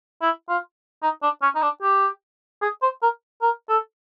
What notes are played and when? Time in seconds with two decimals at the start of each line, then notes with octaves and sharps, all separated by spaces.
0.22 E4
0.49 F4
1.03 D#4
1.23 D4
1.42 C#4
1.55 D#4
1.63 D4
1.83 G4
2.62 G#4
2.82 C5
3.02 A#4
3.42 A#4
3.69 A4